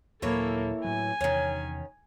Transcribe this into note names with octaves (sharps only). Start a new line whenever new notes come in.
D#2 A#2 E3 F#3 A#3 E4 A4 C#5
A2 F#3 G#5
E2 C3 D#3 C#4